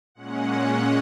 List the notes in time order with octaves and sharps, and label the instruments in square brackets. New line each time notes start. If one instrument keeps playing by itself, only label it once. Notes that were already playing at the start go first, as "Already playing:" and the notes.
[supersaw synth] A#2 G#3 C#4 F#5